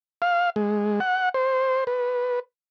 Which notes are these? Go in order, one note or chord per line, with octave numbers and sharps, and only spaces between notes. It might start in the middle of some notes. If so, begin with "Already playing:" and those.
F5
G#3
F#5
C5
B4